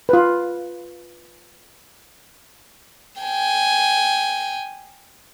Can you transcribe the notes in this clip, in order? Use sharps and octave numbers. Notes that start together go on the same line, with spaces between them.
F4 B4
G5 G#5